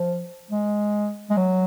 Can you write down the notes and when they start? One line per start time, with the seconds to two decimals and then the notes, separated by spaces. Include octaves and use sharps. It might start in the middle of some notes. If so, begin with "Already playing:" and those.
Already playing: F3
0.51 G#3
1.30 G#3
1.37 F#3